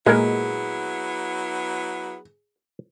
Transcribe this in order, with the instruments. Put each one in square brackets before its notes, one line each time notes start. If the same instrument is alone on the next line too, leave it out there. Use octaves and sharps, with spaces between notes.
[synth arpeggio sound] A#2 [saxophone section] F#3 B3 E4 [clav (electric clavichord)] G#3 A#4 [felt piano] G#4